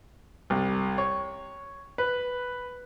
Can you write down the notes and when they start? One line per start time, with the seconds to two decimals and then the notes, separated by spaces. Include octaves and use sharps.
0.50 C2
0.98 C#5
1.98 B4